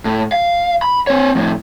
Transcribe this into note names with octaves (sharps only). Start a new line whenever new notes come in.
A2
F5
B5
C4 C#5
F2 A2